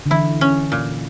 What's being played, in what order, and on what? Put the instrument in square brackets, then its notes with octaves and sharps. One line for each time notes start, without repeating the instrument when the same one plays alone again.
[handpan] D3
[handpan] E3 [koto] E4
[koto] C#4
A#2